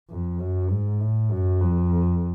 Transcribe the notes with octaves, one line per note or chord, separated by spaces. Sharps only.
F2
F#2
G#2
A2
F#2
F2